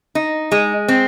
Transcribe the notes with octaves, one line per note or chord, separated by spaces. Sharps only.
D#4
G#3
C4